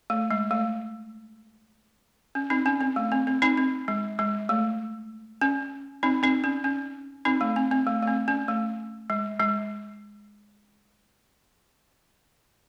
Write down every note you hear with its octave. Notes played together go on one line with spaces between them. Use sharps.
A3
G#3
A3
C#4
C4 D#4
C#4
C4
A3
C4
C4
C4 D#4
C4
G#3
G#3
A3
C#4
C4 D#4
C4 D#4
C#4
C#4
C4 D#4
A3
C4
C4
A3
A3
C4
C#4
A3
G#3
G#3